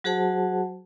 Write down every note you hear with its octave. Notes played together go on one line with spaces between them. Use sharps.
F#3 F#4 G#4 C5 F#5 A5